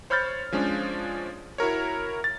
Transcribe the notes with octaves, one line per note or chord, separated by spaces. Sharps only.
C5 C#5 B5 F6 G6 A6
F3 G#3 C#4 D4
E4 F#4 A#4 C#5
A6